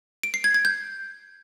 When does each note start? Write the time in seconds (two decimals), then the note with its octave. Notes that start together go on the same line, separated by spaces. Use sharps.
0.23 D7
0.34 C7
0.44 G#6
0.54 G#6
0.65 G6